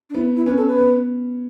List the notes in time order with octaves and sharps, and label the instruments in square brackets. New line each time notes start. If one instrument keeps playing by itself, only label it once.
[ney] D4
[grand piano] B3 [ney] E4
[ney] E4
[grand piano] C#4 [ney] B4
[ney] A4
B4
[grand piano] B3